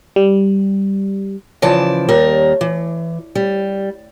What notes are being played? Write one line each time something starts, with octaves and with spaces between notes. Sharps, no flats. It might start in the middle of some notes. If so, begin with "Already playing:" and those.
G3
C#3 E3 F3 D5 A5
D#2 G3 A#4
E3
G3